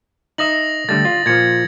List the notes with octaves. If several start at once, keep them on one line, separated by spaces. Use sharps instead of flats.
D#4 E5 D#6 A#6 F#7
D3 G3 A3 A6
F4
A#2 F3 G#6 C#7